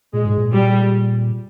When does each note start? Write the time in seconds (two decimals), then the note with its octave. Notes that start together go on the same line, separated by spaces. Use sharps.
0.13 A#2 G#3
0.25 G#2
0.38 A#2
0.52 G3